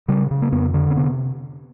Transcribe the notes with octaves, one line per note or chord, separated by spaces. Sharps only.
C#3 G3
C#3
A#3
F2 B3
D3
C4
C3 B3